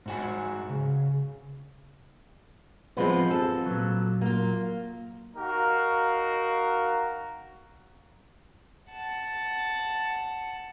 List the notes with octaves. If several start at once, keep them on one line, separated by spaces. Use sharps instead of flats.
G#2 F#4 G#5
C#3
F3 G#3 B3 C4 F4 B4
A4
A#2 F#3
A#3 F4
D#4 F#4 A#4 F5
F#5 A5